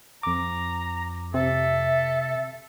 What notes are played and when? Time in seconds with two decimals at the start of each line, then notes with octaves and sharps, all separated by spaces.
0.23 F2 A#5 D6
1.34 C3 A4 E5